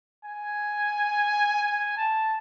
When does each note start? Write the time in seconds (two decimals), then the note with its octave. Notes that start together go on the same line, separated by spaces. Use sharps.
0.25 G#5
1.63 G#5
1.96 A5